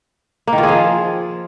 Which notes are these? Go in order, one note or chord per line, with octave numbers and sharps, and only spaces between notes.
A#3
D#3
F4
G#4
F3